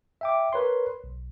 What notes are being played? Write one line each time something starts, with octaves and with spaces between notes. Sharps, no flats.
E5 G5 D6
A#4 B4 C#5 C6
B1